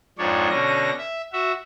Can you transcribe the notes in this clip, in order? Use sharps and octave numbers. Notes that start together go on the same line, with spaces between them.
F2 G#2 D4 C#5
B2 D3 C#4 A#6
E5
F#4 E5